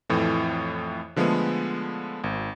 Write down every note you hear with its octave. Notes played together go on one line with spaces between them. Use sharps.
F2 A2 E3 A3
D3 F3 G#3 A3 B3
G#1